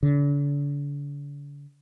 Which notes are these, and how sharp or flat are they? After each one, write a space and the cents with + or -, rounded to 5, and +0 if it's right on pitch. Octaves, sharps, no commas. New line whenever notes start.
D3 -40